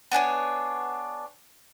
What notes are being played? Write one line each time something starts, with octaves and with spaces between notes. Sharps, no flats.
B3 D4 G#4 C#5